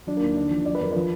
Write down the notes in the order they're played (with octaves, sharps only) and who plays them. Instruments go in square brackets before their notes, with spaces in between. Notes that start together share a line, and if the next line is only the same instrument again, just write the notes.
[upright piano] F#3 D4
A#3
D#2
D3 D4
F3
F#3 D5
B4
F2 A#4
F3 B4